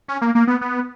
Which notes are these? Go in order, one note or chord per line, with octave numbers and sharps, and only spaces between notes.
C#4
A#3
A#3
B3
B3